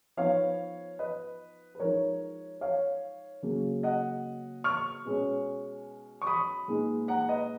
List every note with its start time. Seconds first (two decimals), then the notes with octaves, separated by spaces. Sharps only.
0.17 F3 B3 D#4 C#5 F5
0.99 B4 D#5
1.75 B4
1.79 F3 G#3 D#4 A#4 C#5
2.61 C#5 F5
3.43 C#3 F#3 A#3
3.83 D#5 F#5
4.64 C#6 F6
5.05 B2 G#3 C#4
6.22 C#6
6.27 B5 D#6
6.68 A#2 G#3 B3 D#4
7.08 F#5 A#5
7.28 B4 D#5